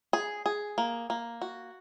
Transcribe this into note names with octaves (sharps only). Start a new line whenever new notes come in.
G#4
G#4
A#3
A#3
F#4